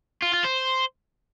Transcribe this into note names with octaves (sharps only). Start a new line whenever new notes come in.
F4
F4
C5